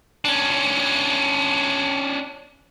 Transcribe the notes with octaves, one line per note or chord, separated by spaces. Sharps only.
C#4 D4